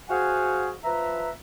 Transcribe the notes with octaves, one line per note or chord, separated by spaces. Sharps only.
F#4 G#4 C5 F5 F#5 G#5
F3 B4 E5 A#5